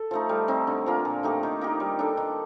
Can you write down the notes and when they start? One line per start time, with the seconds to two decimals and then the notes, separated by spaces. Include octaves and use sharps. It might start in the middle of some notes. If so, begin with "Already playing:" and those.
Already playing: A4
0.11 F3 A3 D#4
0.29 G3
0.48 C4 D#4
0.67 D3
0.86 F3 A#3 F4
1.05 A#2
1.23 A3 D#4 G4
1.43 D#3
1.61 A#3 D#4 G4
1.80 G3
1.99 D4 A4
2.17 D#3